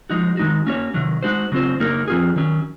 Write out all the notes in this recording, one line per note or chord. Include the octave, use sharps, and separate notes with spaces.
F3 G#3 D#4 F#4
D#3 G#3 D#4 F#4
A#3 C#4 F#4 C#5
C3 D#3 F#3
G#3 D#4 F#4 C5
C#3 F#3 C4 F4 C5
C#3 F#3 A#3 D#4 A#4
F3 C4 F4 G#4
D#3 F#3 C#4